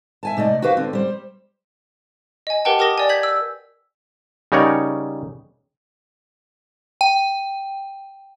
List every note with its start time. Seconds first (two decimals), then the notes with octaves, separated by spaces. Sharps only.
0.23 E5 G#5 A5
0.37 C3 A3 D5 D#5
0.62 F#4 G4 B4 C5 F5
0.77 D3 C4
0.93 G3 C5
2.47 D#5 G#5
2.65 G4 A#4 B4 F#5 G5 A5
2.79 G4 A#4 D#6 A#6
2.98 D5 G#5
3.09 G6 G#6 B6 F#7
3.23 E6
4.52 C#3 G3 D#4 A#4 C#5 F#5
7.01 G5